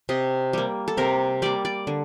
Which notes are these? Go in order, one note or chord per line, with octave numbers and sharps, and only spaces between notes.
C3 D#5
G3 A#3
A4
C3 A#4
G3 A#3 D5
D5
D3